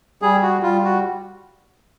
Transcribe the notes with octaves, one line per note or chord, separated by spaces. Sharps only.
G3 G#4
F#4
G3 F4
F#4